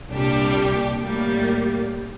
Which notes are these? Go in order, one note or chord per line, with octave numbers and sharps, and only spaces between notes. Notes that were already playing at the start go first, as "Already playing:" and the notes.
C2 A#2 G3 D4 G4
A2 G3 A#3